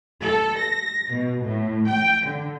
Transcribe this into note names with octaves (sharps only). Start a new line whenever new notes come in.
A4
A#6
B2
A2
G5
D3